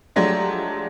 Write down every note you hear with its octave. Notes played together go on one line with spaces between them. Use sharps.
F3 F#3 G#3 A3 D4 G4